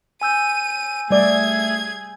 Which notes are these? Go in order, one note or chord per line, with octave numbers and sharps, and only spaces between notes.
G#5 E6 G6 D#7
G3 A3 G#4 D5 G#6